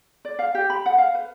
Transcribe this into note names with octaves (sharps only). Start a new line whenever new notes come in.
D5
F5
G4
B5
F#5
F5
B4